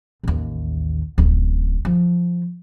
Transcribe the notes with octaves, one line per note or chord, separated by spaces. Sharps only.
A1 D#2
D1 A1
F3